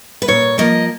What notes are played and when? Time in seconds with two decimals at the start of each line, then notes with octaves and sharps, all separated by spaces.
0.22 B4
0.28 A#2 C#5
0.58 F3 A#3 D#5